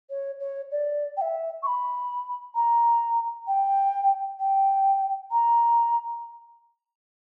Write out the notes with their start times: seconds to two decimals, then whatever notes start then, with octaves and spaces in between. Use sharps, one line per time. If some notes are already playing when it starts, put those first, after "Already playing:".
0.10 C#5
0.40 C#5
0.71 D5
1.17 G5
1.21 E5
1.63 C#6
1.67 B5
2.55 A#5
3.47 G5
4.40 G5
5.31 A#5